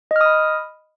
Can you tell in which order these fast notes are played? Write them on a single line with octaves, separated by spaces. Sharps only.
D#5 F6 D#6 B5